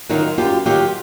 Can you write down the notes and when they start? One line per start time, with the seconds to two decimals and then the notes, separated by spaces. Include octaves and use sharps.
0.09 D#3 F#3 D#4 F4
0.38 F#2 F4 G4
0.66 D#3 F#3 F4 G4